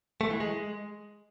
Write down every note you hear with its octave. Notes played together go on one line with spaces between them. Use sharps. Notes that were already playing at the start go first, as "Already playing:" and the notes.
A3
E3
G#3